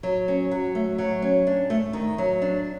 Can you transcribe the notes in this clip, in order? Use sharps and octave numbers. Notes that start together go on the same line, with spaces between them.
F#3
C#4
F#3
A3
F#3
C#4
D4
A3
D#3
F#3
D4